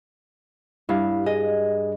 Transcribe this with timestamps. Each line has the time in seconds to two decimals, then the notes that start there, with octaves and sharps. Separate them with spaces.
0.89 G2 E4 F5
1.26 G#4 D#5